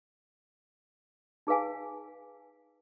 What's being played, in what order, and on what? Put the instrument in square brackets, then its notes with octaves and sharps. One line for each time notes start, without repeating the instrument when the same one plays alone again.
[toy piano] D#4 G#4 B4 F5 G#5